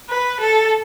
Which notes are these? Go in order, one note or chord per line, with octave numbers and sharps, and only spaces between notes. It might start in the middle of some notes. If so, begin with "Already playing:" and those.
B4
A4